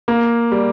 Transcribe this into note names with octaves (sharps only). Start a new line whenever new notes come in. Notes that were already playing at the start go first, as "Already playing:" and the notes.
A#3
G3